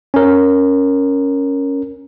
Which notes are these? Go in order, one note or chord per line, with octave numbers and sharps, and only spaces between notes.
C#4 A#4